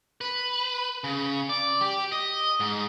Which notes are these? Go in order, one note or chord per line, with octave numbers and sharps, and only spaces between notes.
B4
C#3
D5
G4
D#5
G#2